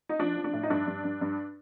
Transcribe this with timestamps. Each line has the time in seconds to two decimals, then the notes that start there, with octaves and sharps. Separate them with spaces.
0.09 D#4
0.19 F3 D4
0.36 F3
0.44 D4
0.53 A2
0.63 D#4
0.70 G2 D4
0.87 G2
1.04 G2
1.21 G2